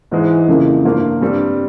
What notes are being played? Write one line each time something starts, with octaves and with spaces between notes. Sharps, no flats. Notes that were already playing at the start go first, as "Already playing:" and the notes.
G#2 E3 G#3
F2 C#3 F3 A#3 E4
G2 F3 A#3 F4
G2 G3 C4